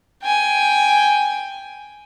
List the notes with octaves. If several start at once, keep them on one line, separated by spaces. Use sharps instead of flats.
G5 G#5